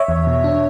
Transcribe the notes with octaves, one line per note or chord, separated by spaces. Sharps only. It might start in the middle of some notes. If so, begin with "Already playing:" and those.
Already playing: C#5 E5
E2
B2
D4